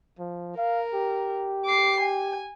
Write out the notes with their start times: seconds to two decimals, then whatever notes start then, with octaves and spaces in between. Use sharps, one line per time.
0.19 F3
0.57 A#4 F5
0.94 G4
1.65 D6 C7
2.00 G#5